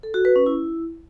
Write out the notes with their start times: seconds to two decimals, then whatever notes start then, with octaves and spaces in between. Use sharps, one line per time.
0.03 A4
0.14 F#4
0.25 B4
0.36 C#4
0.46 E4